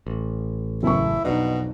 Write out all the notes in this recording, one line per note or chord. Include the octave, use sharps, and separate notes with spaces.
A1
F#1 E4 C#6
B1 F2 B2 D4 D#4